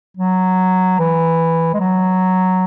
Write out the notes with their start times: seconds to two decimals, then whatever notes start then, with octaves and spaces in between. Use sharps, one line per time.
0.17 F#3
0.99 E3
1.74 G#3
1.80 F#3